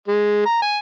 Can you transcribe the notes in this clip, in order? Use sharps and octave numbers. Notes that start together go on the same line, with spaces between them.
G#3
A#5
G#5